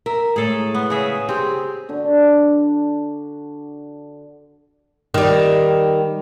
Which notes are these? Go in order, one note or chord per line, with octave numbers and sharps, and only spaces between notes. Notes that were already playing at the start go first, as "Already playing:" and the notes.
A#4 E5
A2 G#3 G#4 A4
B3
C#3 G#4 E5
C4 G4 G#4
D3 D4 F#4
D#3 G3